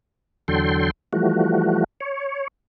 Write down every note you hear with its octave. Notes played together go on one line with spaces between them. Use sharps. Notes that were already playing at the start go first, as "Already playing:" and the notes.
E2 D3 F#3 A4 G5 C6
E3 F3 G3 A3 F#4
C#5